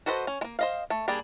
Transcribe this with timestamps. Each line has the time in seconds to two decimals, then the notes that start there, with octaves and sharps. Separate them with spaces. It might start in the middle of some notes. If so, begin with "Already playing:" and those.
0.06 F#4 A4 B4 C5 D#5
0.27 C#4
0.41 G#3 A#3
0.59 C5 D#5 F5
0.90 A3
1.08 G3 A#3 D4 G#4 D5